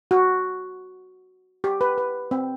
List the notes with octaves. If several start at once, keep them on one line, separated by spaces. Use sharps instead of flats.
F#4
G4
B4
B4
C4